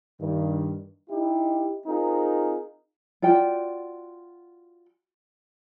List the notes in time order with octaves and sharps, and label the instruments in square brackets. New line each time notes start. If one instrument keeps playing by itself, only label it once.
[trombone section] G2 D#3
D#4 E4 G4
C4 D#4 F4 G#4 A#4
[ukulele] F4 F#4 D5 G5